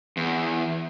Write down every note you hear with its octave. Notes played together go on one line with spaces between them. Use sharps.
E2